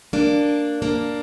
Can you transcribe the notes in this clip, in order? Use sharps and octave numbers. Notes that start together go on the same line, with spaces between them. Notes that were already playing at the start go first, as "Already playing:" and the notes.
A#3 D4
A#3 D4